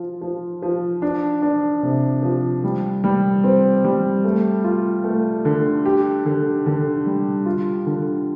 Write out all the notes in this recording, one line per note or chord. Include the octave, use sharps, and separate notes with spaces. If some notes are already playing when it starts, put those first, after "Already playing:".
Already playing: F3 F4
F3
F3
D4
D4
C3
F3
G3
G3
C4
G3
A3
F4
A3
D3
G4
D3
D3
G3
F4
D3